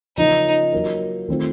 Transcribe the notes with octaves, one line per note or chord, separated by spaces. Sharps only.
C#3 F3 A#3 C#4 D#4
F#3 A#3 D#4 A#4
D#3 A3 C4 F4 C5